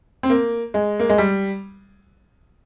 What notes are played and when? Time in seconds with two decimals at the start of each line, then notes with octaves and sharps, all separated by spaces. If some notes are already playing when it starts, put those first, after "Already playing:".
0.23 C4
0.30 A#3
0.74 G#3
1.00 A#3
1.09 G#3
1.18 G3